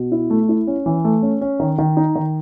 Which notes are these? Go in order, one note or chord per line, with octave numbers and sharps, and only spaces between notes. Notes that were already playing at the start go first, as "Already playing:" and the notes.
Already playing: B2
E4
A3
E4
C#4
E3
A3
C#4
C#4
D#3
D#3
D#4
D#3